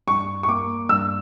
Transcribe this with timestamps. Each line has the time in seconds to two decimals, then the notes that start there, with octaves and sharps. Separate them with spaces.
0.07 G2 C#6
0.43 C#6
0.48 A#3 D6
0.89 G2 E6